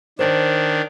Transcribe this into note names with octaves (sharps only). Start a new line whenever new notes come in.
D#3 D4 C5 C#5 A5